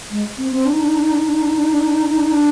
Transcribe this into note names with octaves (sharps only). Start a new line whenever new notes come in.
G#3
C4
C4
D4
D#4
D4
D#4
D4
D#4
D4
D#4
D4
D#4
D4
D#4
D4
D#4
D4
D#4
D4
D#4
D4
D#4
D4
D#4
D4